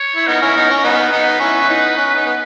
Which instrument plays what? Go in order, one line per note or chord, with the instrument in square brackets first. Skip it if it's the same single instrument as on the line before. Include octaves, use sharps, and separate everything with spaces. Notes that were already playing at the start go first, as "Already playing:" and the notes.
Already playing: [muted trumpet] C#5
[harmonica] E4
[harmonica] B3 D#4 [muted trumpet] A#4
[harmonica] C#4 E4
B3 D#4
C#4
[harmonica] B3 D#4 [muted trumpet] B4
[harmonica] B3 D#4
C#4 E4
E4
B3 D#4
C#4
B3 D#4
B3